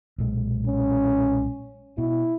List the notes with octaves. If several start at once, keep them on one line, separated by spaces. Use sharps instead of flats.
B1 A#2 G#3
C#4
B2 E4